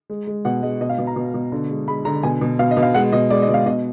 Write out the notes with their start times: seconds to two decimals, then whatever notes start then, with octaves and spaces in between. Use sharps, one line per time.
0.10 G#3
0.27 G#3
0.45 B2 F#5
0.62 G#3 D#5
0.81 B2 D#5
0.89 F5
0.98 B2
1.07 A#5
1.16 B2
1.34 B2
1.52 D3
1.70 G#3
1.88 G#3 B5
2.05 D3 A#5
2.23 B2 G#5
2.41 B2
2.59 B2 F5
2.71 D#5
2.77 B2
2.83 F5
2.94 G#3 F#5
3.12 B2 D#5
3.30 G#3 D5
3.42 D#5
3.49 B2
3.54 F5
3.66 B2 D#5